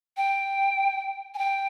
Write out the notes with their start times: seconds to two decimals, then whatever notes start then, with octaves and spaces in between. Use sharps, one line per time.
0.17 G5
1.34 G#5
1.38 G5